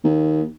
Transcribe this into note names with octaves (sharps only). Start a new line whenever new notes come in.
D#2